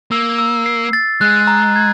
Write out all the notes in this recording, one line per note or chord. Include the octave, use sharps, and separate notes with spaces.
A#3 E6
E6
C7
A6
G#3 F#6
A#5
G#6